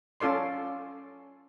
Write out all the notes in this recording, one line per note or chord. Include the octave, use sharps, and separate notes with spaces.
C#4 F4 A4 D5 C6